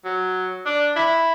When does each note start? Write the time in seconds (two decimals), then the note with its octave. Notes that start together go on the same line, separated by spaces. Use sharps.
0.05 F#3
0.66 D4
0.97 E4